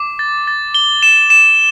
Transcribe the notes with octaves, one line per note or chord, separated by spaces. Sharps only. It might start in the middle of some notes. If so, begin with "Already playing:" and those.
Already playing: D6
A6
A6
G7
E7
E7